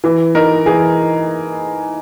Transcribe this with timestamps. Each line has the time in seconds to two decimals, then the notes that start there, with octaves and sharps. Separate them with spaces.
0.04 E3
0.35 D#4 A#4
0.66 E3 G#4